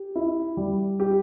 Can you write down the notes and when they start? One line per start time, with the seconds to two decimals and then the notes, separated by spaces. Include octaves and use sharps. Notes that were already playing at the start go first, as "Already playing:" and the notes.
Already playing: G4
0.15 E4
0.57 G3
1.00 G4